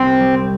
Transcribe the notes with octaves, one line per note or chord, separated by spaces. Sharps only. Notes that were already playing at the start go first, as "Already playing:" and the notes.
Already playing: C2 C4
G3